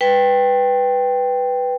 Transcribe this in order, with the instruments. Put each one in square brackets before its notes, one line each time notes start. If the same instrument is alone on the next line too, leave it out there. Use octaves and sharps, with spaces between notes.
[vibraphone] B4 G5